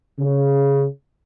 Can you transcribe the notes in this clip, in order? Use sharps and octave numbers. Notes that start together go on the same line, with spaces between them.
C#3